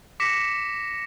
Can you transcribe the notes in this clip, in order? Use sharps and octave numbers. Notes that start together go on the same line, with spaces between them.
D6 A#6 B6 C#7 E7